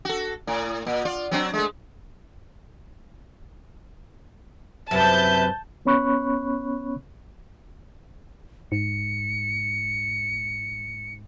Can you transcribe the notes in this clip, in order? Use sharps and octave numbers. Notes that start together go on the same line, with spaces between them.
F#4 A4
A2
A#2
F4 D5
F#3 C4 D4
G#3 A3
F#2 C3 B4 E5 A5 G6
B3 C#4 C#5 B5 C#6 F#6
G#2 C#7